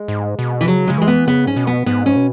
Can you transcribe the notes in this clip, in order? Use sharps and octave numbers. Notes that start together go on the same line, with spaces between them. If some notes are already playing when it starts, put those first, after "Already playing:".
Already playing: G#3
G#2
B2
E3
C#3 F#3
C#3 G#3
E3 G#3
B3
C#3 B3
G#2 C#4
B2
B3
G#2 B3
C#4
B2